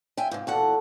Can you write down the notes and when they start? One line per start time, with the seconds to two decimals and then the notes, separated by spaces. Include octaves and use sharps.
0.17 F4 E5 G5 G#5
0.31 G#2 C3
0.47 E2 A#2 F#4 A4 F#5